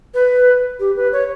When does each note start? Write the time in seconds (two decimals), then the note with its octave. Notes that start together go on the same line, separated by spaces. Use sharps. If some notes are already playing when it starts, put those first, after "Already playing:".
0.14 B4
0.80 G4
0.97 B4
1.13 C#5